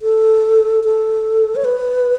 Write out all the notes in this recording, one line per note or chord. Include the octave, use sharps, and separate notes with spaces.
A4
A4
C#5
B4